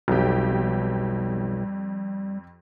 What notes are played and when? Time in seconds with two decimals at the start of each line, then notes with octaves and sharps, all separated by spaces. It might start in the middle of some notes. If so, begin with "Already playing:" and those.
0.08 B1 F2 G3 G4